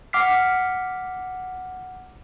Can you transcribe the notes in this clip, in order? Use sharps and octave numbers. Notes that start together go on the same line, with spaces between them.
F#5 D6 F6 B6 C7